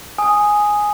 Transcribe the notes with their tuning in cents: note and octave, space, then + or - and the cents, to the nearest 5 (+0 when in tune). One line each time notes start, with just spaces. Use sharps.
G#5 +0 D#6 +0